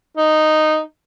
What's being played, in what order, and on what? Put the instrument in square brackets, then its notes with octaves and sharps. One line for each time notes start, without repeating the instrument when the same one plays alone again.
[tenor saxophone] D#4